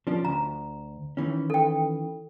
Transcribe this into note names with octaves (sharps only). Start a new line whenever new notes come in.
F3 C#4 D4
D2 A#5
D#3 E3 C#4
A4 G5